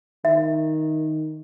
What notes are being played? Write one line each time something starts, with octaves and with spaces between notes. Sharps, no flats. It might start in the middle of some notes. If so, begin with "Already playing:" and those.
D#3 E5